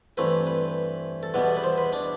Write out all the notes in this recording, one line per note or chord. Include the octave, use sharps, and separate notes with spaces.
G2 E3 A3 C4 B4
B4
A4
E2 B2 G3 B3 B4
B4
C5
B4
D4